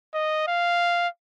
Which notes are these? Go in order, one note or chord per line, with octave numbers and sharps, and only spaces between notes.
D#5
F5